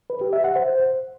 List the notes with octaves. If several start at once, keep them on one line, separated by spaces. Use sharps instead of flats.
B4
G4
E5
F#5
C5